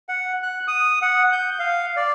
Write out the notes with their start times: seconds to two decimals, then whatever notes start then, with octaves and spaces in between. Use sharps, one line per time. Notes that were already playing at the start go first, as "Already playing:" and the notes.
0.09 F#5
0.43 F#6
0.68 D#6
1.02 F#5
1.33 G6
1.59 F5
1.96 D5